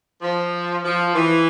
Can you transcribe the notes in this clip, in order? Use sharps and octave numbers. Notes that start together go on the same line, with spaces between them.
F3
F3
E3